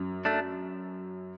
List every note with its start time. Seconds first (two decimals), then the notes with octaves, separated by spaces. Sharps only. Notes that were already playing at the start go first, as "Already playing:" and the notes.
Already playing: F#2
0.25 A3 D4